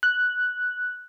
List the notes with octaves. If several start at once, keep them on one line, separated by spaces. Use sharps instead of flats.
F#6